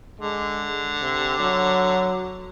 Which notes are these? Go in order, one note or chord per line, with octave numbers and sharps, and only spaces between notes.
D3 G#3
C3
F#3